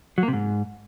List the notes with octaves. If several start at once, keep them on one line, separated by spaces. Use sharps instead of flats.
F#3
A#3
C3
G#2